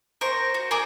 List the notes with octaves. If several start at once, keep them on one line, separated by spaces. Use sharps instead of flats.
A#4 C5 C#6
F#4
G#4 A#4 D5 D6